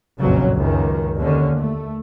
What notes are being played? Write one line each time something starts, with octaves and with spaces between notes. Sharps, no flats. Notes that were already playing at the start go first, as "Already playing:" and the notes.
F#1 B1 F2 A#2 C#3 F#3
C#2 F#2 D#3
D#2 D3 C#4
A3